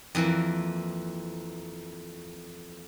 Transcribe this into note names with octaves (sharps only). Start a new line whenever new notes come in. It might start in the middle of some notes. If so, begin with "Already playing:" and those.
F2 E3 A#3